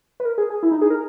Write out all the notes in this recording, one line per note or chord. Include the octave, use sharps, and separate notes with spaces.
B4
A#4
G#4
G#4
E4
D#4
G#4
A#4